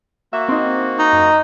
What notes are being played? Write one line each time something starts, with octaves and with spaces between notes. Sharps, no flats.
A#3 F#4 E5
C4 D#4
D#4
F#2